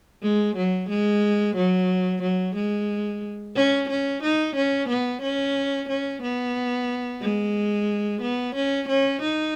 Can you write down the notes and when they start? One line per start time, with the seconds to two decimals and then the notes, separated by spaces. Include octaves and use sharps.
0.23 G#3
0.56 F#3
0.89 G#3
1.56 F#3
2.22 F#3
2.55 G#3
3.56 C#4
3.89 C#4
4.23 D#4
4.55 C#4
4.88 B3
5.22 C#4
5.88 C#4
6.22 B3
7.22 G#3
8.22 B3
8.55 C#4
8.88 C#4
9.22 D#4